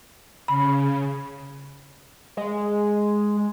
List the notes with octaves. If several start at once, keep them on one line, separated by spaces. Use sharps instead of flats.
C#3 B5
G#3